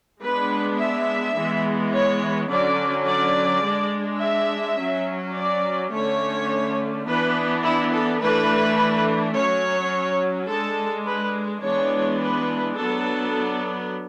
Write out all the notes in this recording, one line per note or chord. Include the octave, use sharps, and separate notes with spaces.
G#3 B3 D4 B4
E5
E3 G#3 B3
C#5
D3 F#3 C#4 D5
D5
G#3 D4
E5
F#3 C#4
D5
D3 A3 C#4 C#5
E3 B3 D4 B4
E4
A4
E3 A3 D4 B4
F#3 C#4 C#5
G#3 D4 A4
B4
E3 G#3 B3 D4 C#5
B4
F#3 B3 D4 A4